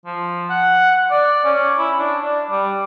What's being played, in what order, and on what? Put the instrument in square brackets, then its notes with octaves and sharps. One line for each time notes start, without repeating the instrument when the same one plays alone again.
[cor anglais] F3
F#5
F#5
D5
C#4
E4
D4
D4
G3